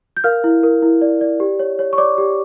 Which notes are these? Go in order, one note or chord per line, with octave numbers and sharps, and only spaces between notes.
G6
A#4 F5 F6
E4
A#4
E4
D5
D5
G4
C#5
C#5
C#6
C#5 D5 D6
G4